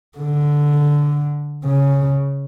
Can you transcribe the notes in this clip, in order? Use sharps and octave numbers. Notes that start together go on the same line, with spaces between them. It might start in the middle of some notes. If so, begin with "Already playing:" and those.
D3
C#3